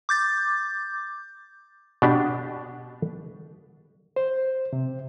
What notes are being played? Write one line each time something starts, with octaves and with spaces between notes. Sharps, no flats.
D6 G6 A6
B2 D4 G4
C5
C3